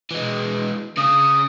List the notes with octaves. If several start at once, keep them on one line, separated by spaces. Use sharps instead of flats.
E3 G#3
C#3 G#4 D#6